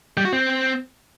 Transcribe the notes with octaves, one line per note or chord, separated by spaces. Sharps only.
G3
F#4
C4